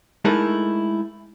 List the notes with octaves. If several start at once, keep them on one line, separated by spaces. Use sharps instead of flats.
G#3 A3 D#4 E4 A4 A#4